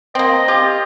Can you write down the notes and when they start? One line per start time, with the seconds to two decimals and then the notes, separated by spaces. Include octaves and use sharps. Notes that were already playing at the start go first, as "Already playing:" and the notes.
0.15 A#3 C4 D#5
0.48 F4 G4